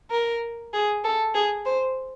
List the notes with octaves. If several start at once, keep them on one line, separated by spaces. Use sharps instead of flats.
A#4
G#4
A4
G#4
C5